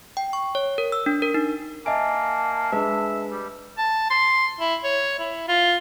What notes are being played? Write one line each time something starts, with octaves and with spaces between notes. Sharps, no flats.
G5
C#6
C#5
A#4
E6
D4
A#4
D#4
A#3 D#5 E5 G#5 A5 D7
G#3 D4 B4 E5
G3
A5
C6
E4
C#5
E4
F4